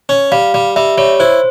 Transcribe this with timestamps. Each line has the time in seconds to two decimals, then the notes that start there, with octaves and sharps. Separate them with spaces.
0.09 C#4
0.32 G3 F5
0.54 G3
0.76 G3 E5
0.98 G3 C#5
1.20 E4 C5